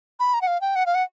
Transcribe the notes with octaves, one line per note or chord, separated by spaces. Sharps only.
B5
A#5
F#5
F5
G5
F#5
F5
F#5